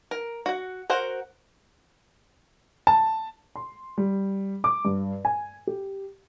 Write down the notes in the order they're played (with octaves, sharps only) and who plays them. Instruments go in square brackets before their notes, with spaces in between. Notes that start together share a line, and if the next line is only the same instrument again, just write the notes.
[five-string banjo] A#4
F#4 F#5
F#4 A#4 C5 F#5
[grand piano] A5
[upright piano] C6
G3
D6
G2
G#5
G4